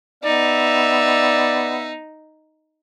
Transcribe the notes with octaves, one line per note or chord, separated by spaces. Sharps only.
B3 D#4 D5 E5